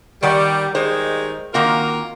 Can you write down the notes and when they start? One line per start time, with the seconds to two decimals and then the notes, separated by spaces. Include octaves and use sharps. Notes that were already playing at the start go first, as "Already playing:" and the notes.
0.23 D#3 G3 D5 F#5
0.75 D#3 G3 G#3 C5
1.54 D#3 A#3 C4 F4 F#4 A#4